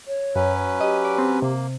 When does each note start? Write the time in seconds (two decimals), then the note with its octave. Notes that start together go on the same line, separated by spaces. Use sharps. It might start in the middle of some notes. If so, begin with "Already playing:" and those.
0.08 C#5
0.36 F#2 F#3 C#4 B4
0.81 G4 D#5
1.05 D5
1.18 C4
1.42 C3 A#3